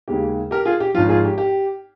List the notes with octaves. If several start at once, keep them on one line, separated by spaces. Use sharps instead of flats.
D#2 C#3 G#3 G4
G4 A#4
F4 G#4
G4
G#1 G#2 F3 F4
F4 G#4
G4
G4